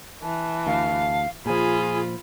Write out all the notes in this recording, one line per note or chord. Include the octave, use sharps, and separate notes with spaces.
E3 A5
D2 F5
A#2 F3 F4 G#4 G#5 B5